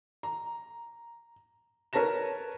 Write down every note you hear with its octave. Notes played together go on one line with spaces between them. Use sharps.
A#5
A#4 B4 C#5 A5 A#6 E7